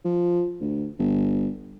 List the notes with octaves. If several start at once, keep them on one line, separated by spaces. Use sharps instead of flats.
F3
D2
G1